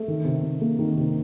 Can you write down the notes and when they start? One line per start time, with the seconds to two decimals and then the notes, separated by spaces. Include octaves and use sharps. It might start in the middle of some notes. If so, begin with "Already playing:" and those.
Already playing: A3
0.08 D#3
0.25 C3
0.43 C3
0.61 A#3
0.79 D#3
0.97 C3